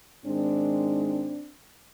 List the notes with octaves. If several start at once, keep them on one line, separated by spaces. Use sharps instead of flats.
G#2 D#3 G#3 C4 D4